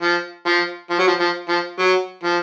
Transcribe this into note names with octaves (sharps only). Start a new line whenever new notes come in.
F3
F3
F3
F#3
F3
F3
F3
F#3
F3